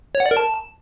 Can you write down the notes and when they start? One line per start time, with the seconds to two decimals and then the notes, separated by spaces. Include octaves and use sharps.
0.15 C#5
0.20 F#5
0.26 D5
0.31 A#4
0.37 A5